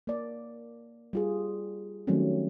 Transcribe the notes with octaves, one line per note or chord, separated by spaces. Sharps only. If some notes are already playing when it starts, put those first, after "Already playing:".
A#3 D5
G3 F4 G#4
D#3 F#3 G3 A3 C4 C#4